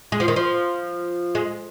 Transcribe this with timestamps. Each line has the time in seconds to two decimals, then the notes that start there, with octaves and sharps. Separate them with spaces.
0.12 G#3
0.20 F3
0.28 D#3
0.36 F3
1.35 G#3